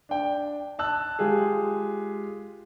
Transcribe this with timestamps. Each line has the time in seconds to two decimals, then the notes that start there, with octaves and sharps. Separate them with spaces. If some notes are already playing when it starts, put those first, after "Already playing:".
0.09 D4 G5
0.79 A5 E6 F#6
1.19 G#3 F4 G4 G#4